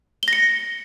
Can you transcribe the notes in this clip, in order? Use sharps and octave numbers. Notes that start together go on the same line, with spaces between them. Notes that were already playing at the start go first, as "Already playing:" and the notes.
A#6 C#7 G7